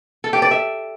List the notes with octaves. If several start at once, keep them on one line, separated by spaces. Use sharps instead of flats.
A4
G4
D5
E5